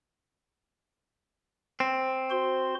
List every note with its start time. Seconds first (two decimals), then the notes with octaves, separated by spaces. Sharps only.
1.80 C4
2.30 F#4 C5 C6